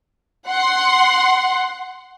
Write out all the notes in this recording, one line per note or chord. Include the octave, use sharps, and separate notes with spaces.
F#5 C6